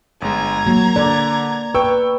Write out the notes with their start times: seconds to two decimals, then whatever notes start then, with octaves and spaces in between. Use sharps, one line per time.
0.22 G1 G#3 A#5 G#6
0.66 F#3 A#3
0.96 D3 D5
1.75 B4 G5 C#6 E6